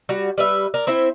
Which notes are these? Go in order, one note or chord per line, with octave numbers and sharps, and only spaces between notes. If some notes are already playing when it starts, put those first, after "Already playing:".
G3 F#4
G3 B4 E5
A#4 D5
C4 E4 C5 E5